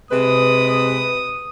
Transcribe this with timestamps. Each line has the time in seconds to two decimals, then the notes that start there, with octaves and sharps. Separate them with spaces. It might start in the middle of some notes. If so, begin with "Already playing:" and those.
0.11 C3 G#3 B4 D#6